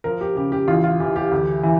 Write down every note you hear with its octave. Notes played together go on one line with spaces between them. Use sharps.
F3 A#4
G4
C#3 G4
G4
A1 F4
F4
E3 G4
G4
D2
E3